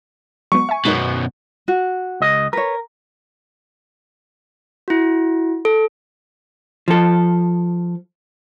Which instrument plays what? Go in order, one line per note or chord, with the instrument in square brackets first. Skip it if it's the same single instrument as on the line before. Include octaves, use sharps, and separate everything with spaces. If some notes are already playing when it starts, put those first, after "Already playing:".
[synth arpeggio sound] F#3 G#3 B3 [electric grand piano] C#6
[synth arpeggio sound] E5 G#5
[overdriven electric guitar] F#2 B2 [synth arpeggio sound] G#3 D#4 A#4
[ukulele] F#4
[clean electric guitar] C#2 D#5
[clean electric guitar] A#4 [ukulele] B4 C#5
[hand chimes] E4 F#4
A4
[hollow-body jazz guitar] F3 A4